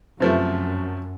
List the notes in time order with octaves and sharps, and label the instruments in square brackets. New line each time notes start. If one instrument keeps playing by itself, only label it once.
[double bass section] F#2 [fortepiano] C3 F3 A3